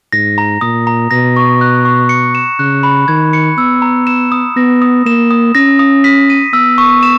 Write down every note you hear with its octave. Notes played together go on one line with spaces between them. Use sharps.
G#2 A#6
A#5
A#2 D#6
A#5
B2 A#6
C#6
F#6
C#6
C#7
E7
C#3 F#6
B5
D#3 G#6
C#7
B3 E6
A#5
E7
D#6
B3 A#6
D#6
A#3 E7
D#6
C#4 A#6
D#6
B6
D#7
B3 E6
C#6
E7